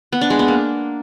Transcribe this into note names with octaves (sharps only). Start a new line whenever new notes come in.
B3
D4
G#3
B3
A#3